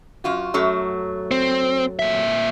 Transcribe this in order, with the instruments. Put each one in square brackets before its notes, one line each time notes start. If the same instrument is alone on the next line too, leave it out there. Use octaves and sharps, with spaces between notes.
[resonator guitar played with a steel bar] F#2 F4 F#4
F#2 F#3 A3
[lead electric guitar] C4
A#2 E5